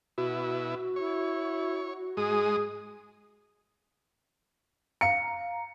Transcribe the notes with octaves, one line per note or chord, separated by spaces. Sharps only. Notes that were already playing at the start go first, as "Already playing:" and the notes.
B2 E4 F#4
E4 C#5
G#2 G#3 G#4 D#6
F5 A#5 C#7